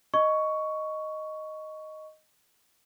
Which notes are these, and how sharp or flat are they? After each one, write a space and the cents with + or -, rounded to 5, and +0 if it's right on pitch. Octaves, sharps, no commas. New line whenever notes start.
D#5 +0 C#6 +10